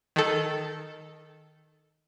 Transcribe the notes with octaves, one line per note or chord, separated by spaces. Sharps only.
D#3 A4